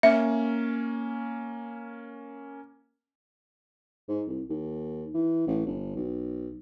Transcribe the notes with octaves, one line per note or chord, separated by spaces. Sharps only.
A#3 C#4 E5
G#2
C2
D#2
E3
A1
G1
B1